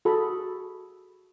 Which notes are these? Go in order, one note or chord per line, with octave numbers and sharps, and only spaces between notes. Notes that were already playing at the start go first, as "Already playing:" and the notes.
F#4 G#4 A4 B5